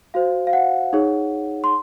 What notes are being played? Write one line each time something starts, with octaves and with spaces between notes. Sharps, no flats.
F#4 C5 F5
F5
F#5
D#4 G#4 C#5
C6